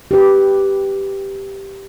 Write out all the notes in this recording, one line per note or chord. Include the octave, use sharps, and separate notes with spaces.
G4 B4